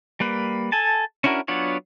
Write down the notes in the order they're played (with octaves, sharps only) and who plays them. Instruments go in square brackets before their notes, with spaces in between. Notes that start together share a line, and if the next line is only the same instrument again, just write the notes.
[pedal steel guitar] G3 A#3 B4
A4 G#5 A5
C#4 D4 E4 F#4 A#4
F#3 B3 D4 F4 C#5